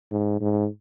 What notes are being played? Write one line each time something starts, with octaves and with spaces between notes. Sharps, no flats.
G#2
G#2